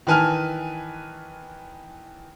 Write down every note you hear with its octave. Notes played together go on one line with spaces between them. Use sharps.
D#3 E3 B4 G#5 A5 F6